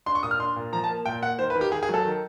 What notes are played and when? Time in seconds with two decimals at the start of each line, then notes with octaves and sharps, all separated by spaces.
0.06 D4 C6
0.15 C#6
0.23 A#2 D#6
0.31 F6
0.39 D4 C6
0.56 A#2
0.72 F3 A#5
0.84 A5
0.89 A#3
1.06 A#2 G5
1.22 A#3 F#5
1.39 D#3 C5
1.50 B4
1.55 D#3
1.61 G4
1.72 D#3 G#4
1.83 G#4
1.89 F#3 A4
2.05 D#3